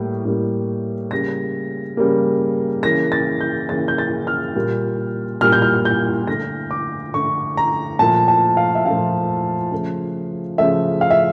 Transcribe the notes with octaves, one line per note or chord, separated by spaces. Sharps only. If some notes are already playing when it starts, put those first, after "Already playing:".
Already playing: A2 G3 A#3
A2 G3 A#3
C#3 G3 A#3 A#6
C#3 G3 A#3
C#3 E3 A#3 A#6
A6
G6
C#3 E3 A#3 A6
G6
A6
F6
A#2 G3 A#3
A#2 G3 A#3 F6
G6
F6
G6
D3 A3 A#6
D6
D3 A3 C#6
A#5
A#2 F3 A3 A5
A5
F5
E5
A#2 F3 A3 F5
C#3 F3 A3
C#3 F3 A3 E5
F5
E5